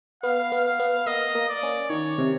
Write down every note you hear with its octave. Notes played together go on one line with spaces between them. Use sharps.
B3 F5
B3
F5
B3
A#3 D#5
A#3
D5
C#4
D#3 C#5
C3